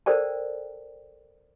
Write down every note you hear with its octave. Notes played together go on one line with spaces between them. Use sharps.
A4 A#4 C5 D5 G5 A5